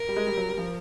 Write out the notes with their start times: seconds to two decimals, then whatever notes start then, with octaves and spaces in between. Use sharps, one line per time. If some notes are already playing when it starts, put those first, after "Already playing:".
Already playing: A#4
0.08 G3
0.16 G#3
0.27 G3
0.37 F#3
0.48 G3
0.58 F3